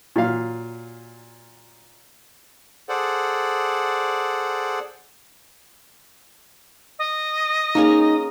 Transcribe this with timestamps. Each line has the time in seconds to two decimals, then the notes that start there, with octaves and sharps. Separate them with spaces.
0.16 A#2 F#3 F5
2.89 G#4 A4 C5 D5 F#5
6.99 D#5
7.75 A#3 C#4 D#4 G#4